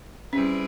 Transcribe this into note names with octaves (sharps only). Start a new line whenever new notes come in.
G3 C4 C#4 E4 G#4 B4